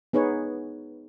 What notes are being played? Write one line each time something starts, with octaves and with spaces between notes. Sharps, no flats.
B3 D#4 G#4 B4 C#5